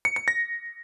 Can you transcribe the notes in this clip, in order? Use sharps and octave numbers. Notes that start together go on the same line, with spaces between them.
C#7
C#7
A#6